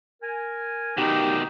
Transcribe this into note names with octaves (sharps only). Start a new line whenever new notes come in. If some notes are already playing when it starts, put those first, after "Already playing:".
A#4 G#5
B2 D#3 D#4 G4